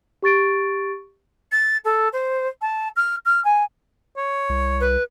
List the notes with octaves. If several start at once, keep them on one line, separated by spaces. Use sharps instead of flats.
G4 C#6 A6 D7
A6
A4
C5
A5
F6
F6
G#5
C#5
C2
B4